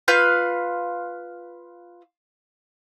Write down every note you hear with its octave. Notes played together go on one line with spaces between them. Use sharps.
F4 B4 F5 G6